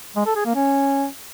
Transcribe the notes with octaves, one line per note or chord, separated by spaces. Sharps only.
G#3
A4
G#4
A#3
C#4